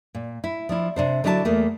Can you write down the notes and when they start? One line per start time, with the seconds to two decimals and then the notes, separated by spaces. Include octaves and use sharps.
0.15 A#2
0.44 E4
0.69 F3 D4 E4
0.96 C3 D4 C5
1.24 D3 F#3 D4 E4 C5 A5
1.45 E2 A3 A#3